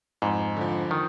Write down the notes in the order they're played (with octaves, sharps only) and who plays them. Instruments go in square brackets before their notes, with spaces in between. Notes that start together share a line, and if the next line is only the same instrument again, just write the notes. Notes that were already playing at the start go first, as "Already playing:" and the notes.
[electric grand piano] F2 [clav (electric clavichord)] G#2
[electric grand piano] D3 F3
[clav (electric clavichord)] D#3